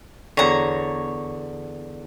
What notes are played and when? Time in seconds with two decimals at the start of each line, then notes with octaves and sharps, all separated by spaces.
0.37 E2 D3 C#5 A#5